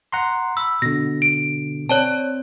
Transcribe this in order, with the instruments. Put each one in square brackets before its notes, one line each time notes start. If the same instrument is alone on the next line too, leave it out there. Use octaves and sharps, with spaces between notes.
[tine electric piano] F#5 A#5 C6
[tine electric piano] B5 [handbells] E6
[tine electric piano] B2 D3 [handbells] A#6
[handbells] D7
[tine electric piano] C4 [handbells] C#5 D5 A5